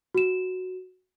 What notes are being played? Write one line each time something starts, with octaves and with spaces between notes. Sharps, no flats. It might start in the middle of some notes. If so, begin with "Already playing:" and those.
F#4 E7